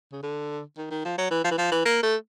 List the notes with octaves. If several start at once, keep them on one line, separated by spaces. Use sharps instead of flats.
C#3
D3
D#3
D#3
F3
F#3
E3
F3
E3
F3
E3
A#3
A3